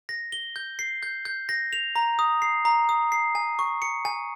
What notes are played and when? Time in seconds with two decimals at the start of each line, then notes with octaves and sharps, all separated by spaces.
0.09 A#6
0.32 G7
0.56 G6
0.79 C7
1.03 G6
1.25 G6
1.49 A#6
1.73 F7
1.96 A#5
2.19 D#6
2.42 C7
2.65 A#5
2.89 D#6
3.12 C7
3.35 G#5
3.59 C#6
3.82 C#7
4.05 G#5